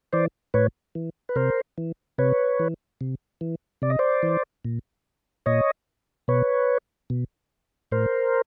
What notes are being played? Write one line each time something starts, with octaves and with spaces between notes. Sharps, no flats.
E3 C5 D5
A2 B4 C#5
E3
B4
C3 A#4 C5
E3
C3 B4 C#5
E3
C3
E3
C3 D5
D#5
C5 D5
E3
A#2
A#2 C#5 D#5
B2 B4 C#5
B2
A2 A#4 C5